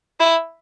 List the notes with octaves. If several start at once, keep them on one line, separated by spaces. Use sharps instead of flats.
E4